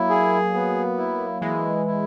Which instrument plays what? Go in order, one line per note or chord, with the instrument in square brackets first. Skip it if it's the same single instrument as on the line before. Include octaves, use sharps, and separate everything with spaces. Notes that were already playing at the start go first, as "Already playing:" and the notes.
Already playing: [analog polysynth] F#3 A#3 [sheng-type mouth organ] E4
[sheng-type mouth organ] G#4
B3
E4
[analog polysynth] E3 G#3 [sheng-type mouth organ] E4
[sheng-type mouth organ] E4